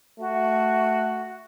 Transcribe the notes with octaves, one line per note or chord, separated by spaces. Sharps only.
A3 F#4